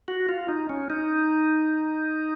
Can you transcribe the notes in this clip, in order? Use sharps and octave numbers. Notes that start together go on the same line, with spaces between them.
F#4
F4
D#4
C#4
D#4